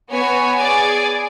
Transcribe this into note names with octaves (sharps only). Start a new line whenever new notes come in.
B3 F#4 C#5 G#5
G#4 D5 G#5